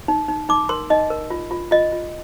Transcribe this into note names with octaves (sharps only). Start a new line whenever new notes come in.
D#4
D#4
D#4 D6
A#4 C6
D#4 D#5
A#4
F4
F4
F4 D#5
F4